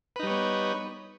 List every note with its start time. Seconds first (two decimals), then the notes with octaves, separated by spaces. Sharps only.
0.16 B4
0.20 D#4
0.23 G3
0.27 C#5
0.30 B3